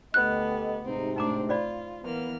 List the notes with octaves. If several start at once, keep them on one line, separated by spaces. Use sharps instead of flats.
D2 B3 G4 A4 D#5 F#6
G#2 C3 C4 D#4
A2 C4 D4 D#4 A#5 D6
F4 C5 D5 B5
E3 A#3 B3 F6